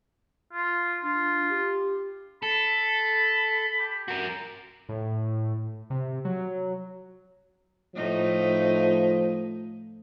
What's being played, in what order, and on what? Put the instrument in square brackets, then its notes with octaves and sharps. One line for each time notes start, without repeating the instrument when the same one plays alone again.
[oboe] F4
[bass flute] D4 [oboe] F4
[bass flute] G4
[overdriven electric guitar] A4 [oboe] B5
[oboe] G4
[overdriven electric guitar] F#4 A#4
[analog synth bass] A2
C3
F#3
[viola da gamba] A2 A3 D#4 [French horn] F3